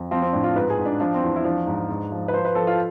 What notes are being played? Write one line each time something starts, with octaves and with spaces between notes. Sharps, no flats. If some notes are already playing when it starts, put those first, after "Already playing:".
Already playing: F2
F3 C4
C4
A2 D4
F4
G#2 B4
G#4
G#2
D4
F3 D4
C4
E2
E4
F3 D4
G#2
G#2
F3
B4
F3 C5
B4
F3 A4
F4